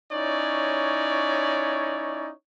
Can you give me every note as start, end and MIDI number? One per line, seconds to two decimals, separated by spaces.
0.12 2.32 61
0.12 2.32 63
0.12 2.32 64
0.12 2.32 73
0.12 2.32 74